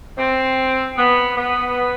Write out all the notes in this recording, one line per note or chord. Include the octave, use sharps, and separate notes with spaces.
C4
B3
B3